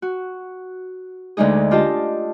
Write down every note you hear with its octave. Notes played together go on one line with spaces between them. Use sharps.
F#4
D2 D3 G#3 D#4 G#4
D4 F4 G4 D#5 A5